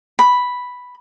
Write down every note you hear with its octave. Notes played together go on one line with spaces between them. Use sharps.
B5